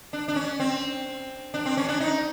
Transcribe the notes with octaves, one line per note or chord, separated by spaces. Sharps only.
D4
D4
C#4
C4
D4
C4
C#4
D4
D#4